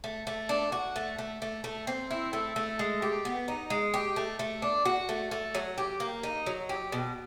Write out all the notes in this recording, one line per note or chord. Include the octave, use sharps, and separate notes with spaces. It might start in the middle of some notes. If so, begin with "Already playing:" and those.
A3
A3
D4
F#4
A3
A3
A3
A3
C4
E4
A3
A3
G#3
G4
B3
D#4
G#3
G4
A3
A3
D4
F#4
A3
A3
F#3
G4
A#3
D#4
F#3
G4
B2